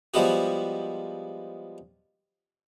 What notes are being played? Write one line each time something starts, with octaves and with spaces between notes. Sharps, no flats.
F3 G3 G#3 B3 F#4